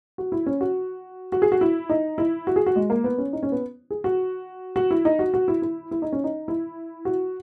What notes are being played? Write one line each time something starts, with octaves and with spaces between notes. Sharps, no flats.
F#4
E4
C#4
F#4
F#4
G#4
F#4
E4
D#4
E4
F#4
G#4
F#4
G#3
A#3
B3
C#4
D#4
C#4
B3
G#4
F#4
F#4
E4
D#4
F#4
F#4
E4
E4
E4
D#4
C#4
D#4
E4
F#4